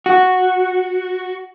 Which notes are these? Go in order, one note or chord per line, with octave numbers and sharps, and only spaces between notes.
F#4